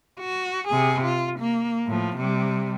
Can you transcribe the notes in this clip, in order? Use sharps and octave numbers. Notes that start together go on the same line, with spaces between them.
F#4
C3 G#4
F4
A#3
A2 F3
C3 G3